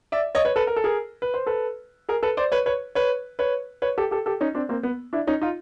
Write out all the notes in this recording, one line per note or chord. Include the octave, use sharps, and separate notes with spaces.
D5 E5
C#5 D#5
B4 C#5
A4 B4
A#4
A4
G#4 A#4
B4
C5
A4 B4
G#4 A#4
A4 B4
C5 D5
B4 C#5
B4 C#5
B4 C#5
B4 C#5
B4 C#5
G4 A4
G4 A4
G4 A4
C#4 D#4
C4 D4
A#3 C4
B3
D4 E4
C#4 D#4
D#4 F4